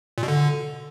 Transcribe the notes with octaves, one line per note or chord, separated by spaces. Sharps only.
A#2
B2
D3